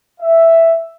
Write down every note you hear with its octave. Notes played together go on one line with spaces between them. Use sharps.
E5